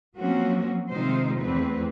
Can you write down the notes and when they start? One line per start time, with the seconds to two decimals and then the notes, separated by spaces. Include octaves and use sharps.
0.17 F3 F#3 A#3 C4 C#4 F#4
0.90 C3 D#3 G#3 D#4 F4 C5
1.40 E2 A3 C4 B4